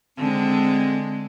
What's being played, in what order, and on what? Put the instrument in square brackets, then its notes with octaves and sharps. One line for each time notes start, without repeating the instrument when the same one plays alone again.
[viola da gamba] D3 G#3 [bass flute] C4